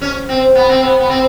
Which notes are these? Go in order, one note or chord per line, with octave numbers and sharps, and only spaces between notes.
C#4
C4
B3
C4
B3
B3
C4